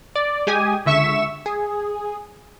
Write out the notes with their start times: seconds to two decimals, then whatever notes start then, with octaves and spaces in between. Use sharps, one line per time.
0.16 D5
0.47 G#3 G4 G#5 D#6
0.86 C#2 D3 E5 C#6 B6 E7
1.46 G#4